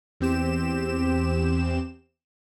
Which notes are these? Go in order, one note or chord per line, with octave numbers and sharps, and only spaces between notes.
E2 C4 G4 E7